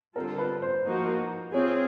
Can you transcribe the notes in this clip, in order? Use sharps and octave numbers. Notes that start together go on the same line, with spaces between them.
D3 G3 C4 F4 A4 A#4
B4
C5
F3 A#3 D#4 F#4
C4 F4 G#4 C#5